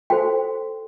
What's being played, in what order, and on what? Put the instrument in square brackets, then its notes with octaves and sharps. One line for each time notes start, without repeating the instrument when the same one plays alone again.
[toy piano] F#4 A4 C5 G5